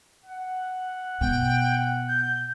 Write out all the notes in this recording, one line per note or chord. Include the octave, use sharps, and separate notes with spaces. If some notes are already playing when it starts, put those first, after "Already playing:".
F#5
B2 G5
G6